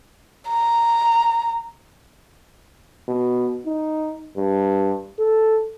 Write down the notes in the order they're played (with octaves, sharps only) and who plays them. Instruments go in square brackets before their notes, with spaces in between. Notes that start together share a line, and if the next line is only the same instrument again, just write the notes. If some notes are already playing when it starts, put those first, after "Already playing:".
[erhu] A#5
[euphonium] B2
D#4
G2
A4